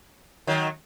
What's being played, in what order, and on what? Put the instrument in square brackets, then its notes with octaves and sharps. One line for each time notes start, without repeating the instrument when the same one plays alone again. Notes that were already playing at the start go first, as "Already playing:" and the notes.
[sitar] D#3 F#3